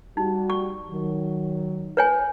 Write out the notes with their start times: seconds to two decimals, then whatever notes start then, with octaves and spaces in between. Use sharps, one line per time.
0.17 G3 D#4 F#4
0.50 C#6
0.89 D#3 F#3
1.97 B4 C#5 G#5